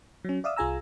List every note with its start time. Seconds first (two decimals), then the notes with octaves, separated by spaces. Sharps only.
0.25 F#3 C#4
0.44 D5 E5 F5 D#6 E6
0.56 C2 F4 G#4 G#5 A#5 E6